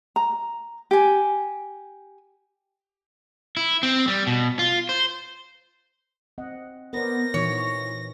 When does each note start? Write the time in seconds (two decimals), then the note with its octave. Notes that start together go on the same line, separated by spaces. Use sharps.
0.16 A#5
0.91 G4 G#5
3.57 E4
3.83 C4
4.08 G3
4.27 B2
4.59 F4
4.89 C5
6.38 C4 D#5 F#5
6.93 B3 A#4 C5 D5 A#6
7.34 A#2 E3 D#4 F#4 C#5